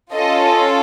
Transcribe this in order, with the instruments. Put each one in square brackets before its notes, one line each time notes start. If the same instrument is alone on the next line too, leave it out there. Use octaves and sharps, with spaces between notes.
[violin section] C#4 F4 A4 D#5